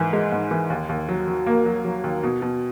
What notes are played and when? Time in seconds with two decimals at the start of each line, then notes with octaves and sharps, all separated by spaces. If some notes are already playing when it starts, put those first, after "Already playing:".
Already playing: G#2 E3
0.13 G#3
0.32 G#2
0.51 E3
0.70 D#2
0.89 D#2
1.09 F#3
1.28 F#3
1.46 A#3
1.66 F#3
1.85 F#3
2.04 D#2
2.23 B2
2.42 B2